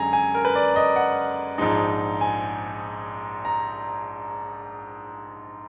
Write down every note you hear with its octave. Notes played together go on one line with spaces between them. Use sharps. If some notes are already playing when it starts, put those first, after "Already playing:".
Already playing: F#2 D3 G#3 G#5 A#5
G#5
A#4
B4
D5
D#5
F#5
A#1 G#2 F3 G#3 D#4
G#5
A#5